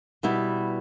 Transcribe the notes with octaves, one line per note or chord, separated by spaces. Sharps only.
B2 G3 B3 E4